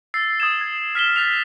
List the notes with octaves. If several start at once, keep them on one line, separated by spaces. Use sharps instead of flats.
E6 A6 C7
D#6 G#6 E7
G#6
F6 B6 E7 G7
F#6 A6 B6 F7